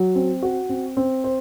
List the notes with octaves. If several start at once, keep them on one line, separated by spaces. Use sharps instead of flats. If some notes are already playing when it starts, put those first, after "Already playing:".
Already playing: F#3
C4
F#4
C4
C4
C5